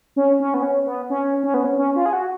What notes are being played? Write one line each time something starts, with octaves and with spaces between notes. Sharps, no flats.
C#4
C#4
B3
C#4
B3
C#4
C#4
B3
C#4
C#4
F4
G#4
F#4